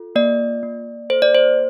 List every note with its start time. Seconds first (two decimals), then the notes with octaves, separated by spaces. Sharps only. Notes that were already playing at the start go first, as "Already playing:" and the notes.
Already playing: F4 A4
0.16 A#3 D5
0.63 A#3
1.10 A4 C5
1.22 D5
1.35 C5